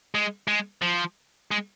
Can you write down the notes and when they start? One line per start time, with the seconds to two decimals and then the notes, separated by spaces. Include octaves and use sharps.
0.15 G#3
0.48 G#3
0.82 F3
1.51 G#3